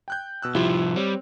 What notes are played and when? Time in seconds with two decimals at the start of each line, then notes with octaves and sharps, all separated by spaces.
0.08 G5 F#6 G6
0.42 B2 E6 F#6
0.55 C2 F3 E4 F4 G4
0.96 G3 C4 C#5